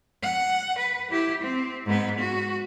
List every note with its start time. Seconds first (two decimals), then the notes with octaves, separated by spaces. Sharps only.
0.23 F#5
0.78 B4
1.11 E4 G4
1.42 C4
1.85 G#2 B3
2.19 F#4